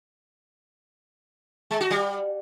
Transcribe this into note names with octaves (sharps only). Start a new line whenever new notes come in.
G#3
F#4
G3